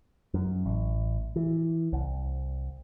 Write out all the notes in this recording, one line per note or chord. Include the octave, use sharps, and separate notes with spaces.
F#2
A1
E3
C2